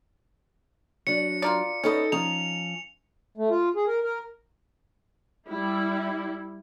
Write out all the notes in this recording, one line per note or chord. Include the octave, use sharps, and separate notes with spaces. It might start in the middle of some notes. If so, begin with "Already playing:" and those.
F#3 D4 C#7
F4 A#4 D5
B3 C#4 D#4 A4 D#5
F3 C#4 D#4 F7
A3
F4
G#4
A#4
A#4
G3 E4